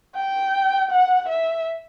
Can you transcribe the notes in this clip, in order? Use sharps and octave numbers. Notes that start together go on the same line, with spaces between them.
G5
F#5
E5